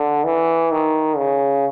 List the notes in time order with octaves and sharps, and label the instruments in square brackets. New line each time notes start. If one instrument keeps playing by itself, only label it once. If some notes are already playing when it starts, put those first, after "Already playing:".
Already playing: [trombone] D3
E3
D#3
C#3